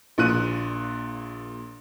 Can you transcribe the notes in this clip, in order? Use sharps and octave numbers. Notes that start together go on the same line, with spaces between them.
A#1 A#2 F#6 D#7